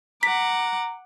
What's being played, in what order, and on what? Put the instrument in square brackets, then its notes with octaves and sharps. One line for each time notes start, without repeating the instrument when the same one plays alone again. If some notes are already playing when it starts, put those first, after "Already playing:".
[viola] F#5 D6 [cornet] A#5 [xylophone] B6